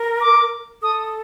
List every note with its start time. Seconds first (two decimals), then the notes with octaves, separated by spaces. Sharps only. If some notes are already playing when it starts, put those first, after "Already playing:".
Already playing: A#4
0.21 D6
0.82 A4 D#6